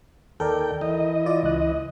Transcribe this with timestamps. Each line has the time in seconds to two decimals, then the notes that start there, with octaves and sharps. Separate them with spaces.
0.40 D#2 A4 A#4 D5 G5
0.81 E3 D#5
1.26 F4 D5
1.43 C#2 F#6